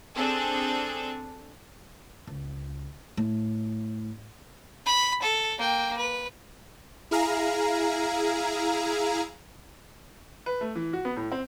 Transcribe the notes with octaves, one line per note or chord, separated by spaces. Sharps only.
C4 D4 G#4 A4
C#2
A2
B5
A4
A#3 G5
B4
E4 G#4 F5 A#5
B4
A3
E3
F#4
B3
A2
C4